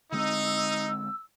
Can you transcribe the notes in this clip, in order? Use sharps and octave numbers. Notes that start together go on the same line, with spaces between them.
D3 G#3 C4 D#4 E6